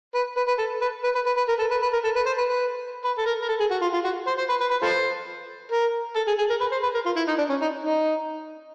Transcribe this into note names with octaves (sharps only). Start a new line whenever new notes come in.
B4
B4
B4
A4
B4
B4
B4
B4
B4
A#4
A4
B4
B4
A#4
A4
B4
C5
B4
B4
B4
A4
A#4
A#4
A4
G#4
F#4
F4
F4
F#4
C5
C5
B4
B4
B4
F4 A4 C5
A#4
A4
G#4
G#4
A#4
B4
C5
B4
A#4
F4
E4
D#4
D4
C#4
D#4
D#4